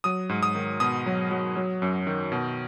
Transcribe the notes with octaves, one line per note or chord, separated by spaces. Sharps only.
F#3 D#6
G#2
D#6
D#3
B2 D#6
F#3
F#3
F#3
F#2
D#3
B2